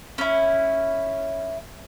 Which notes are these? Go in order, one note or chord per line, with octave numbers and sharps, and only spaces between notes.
C#4 E4